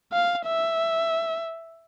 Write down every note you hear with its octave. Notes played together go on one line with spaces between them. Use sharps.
F5
E5